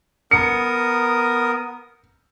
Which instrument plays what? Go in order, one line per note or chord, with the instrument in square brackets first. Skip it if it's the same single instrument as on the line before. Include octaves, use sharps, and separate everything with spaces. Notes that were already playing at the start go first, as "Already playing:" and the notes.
[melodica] B3 A#4 D#6 [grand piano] C#7